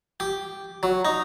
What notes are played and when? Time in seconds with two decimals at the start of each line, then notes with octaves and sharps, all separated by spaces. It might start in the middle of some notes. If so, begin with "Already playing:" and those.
0.20 G4
0.83 F#3
1.05 D#4